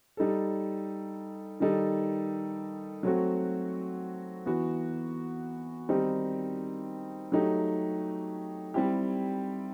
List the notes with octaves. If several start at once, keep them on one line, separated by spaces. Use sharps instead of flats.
G3 D#4 A4
D#3 G3 D#4 A4
F#3 A3 C4 F#4
E3 B3 F#4
D#3 G3 C4 D#4 G4
F#3 A3 D#4 G4
G3 C4 E4 G4